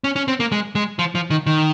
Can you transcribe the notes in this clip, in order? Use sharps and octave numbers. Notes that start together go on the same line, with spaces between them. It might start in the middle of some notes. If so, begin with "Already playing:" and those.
C#4
C#4
C4
A#3
G#3
G#3
F3
F3
D#3
D#3